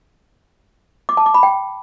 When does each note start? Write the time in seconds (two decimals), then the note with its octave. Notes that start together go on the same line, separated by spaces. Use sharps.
1.09 D6
1.17 A5
1.26 D6
1.34 B5
1.43 G5